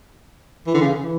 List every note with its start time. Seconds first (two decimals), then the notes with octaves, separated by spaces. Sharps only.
0.67 E3
0.74 D3
0.81 C#3
1.02 E3